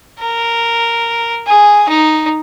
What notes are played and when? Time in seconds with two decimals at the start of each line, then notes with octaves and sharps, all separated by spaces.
0.19 A#4
1.47 G#4
1.89 D#4